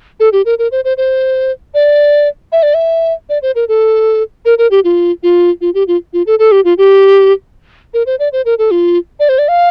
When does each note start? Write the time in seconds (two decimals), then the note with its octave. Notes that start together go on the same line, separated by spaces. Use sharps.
0.20 A4
0.33 G4
0.45 A#4
0.59 A#4
0.72 C5
0.85 C5
0.97 C5
1.74 D5
2.52 E5
2.63 D5
2.74 E5
3.29 D5
3.42 C5
3.55 A#4
3.68 A4
4.45 A#4
4.58 A#4
4.71 G4
4.84 F4
5.23 F4
5.61 F4
5.74 G4
5.88 F4
6.13 F4
6.26 A4
6.39 A4
6.52 G4
6.65 F4
6.78 G4
7.94 A#4
8.06 C5
8.19 D5
8.32 C5
8.45 A#4
8.58 A4
8.71 F4
9.20 D5
9.29 C5
9.39 D5
9.48 F5